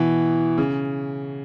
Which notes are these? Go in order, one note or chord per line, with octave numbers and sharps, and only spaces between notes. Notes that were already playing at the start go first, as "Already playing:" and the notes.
Already playing: B2 E3
C#3